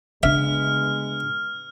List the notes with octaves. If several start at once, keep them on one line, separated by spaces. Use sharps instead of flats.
D2 C#3 G#3 B3 D4 E5 F6